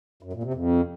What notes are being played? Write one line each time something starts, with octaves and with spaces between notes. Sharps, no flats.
F#2
A#2
C3
F2